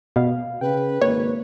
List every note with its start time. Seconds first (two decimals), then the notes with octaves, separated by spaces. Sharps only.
0.16 B2 F5
0.61 C#3 B4 G5
1.02 G#1 A#3 C#5